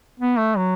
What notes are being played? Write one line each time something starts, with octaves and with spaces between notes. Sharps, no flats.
B3
A3
F#3